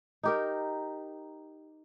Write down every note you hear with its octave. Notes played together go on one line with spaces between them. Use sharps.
D#4 G4 A#4